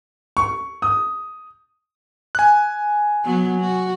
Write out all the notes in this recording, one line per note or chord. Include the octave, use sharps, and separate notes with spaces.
C#6
D#6
G#5 F#6
F#3 B3
F#4